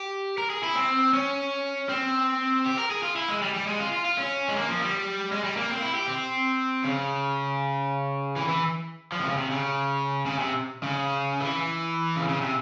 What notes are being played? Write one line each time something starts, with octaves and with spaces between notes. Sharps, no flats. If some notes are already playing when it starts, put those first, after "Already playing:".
Already playing: G4
A#4
G#4
E4
C4
C#4
C4
G4
A#4
G#4
F4
E4
G#3
G3
G3
G#3
F4
F4
F4
C#4
G#3
A#3
F3
G3
G#3
G3
A#3
C4
E4
G4
C4
C#3
E3
E3
F3
C3
C#3
C3
C#3
C#3
C3
C#3
E3
C#3
C#3
C3